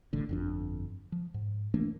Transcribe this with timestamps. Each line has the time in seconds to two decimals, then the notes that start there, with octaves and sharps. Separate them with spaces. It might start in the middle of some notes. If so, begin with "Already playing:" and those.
0.13 A1 A2 D3
0.29 G1 F2 D4
1.12 F3
1.34 G#2
1.74 E3 A3 A#3 D4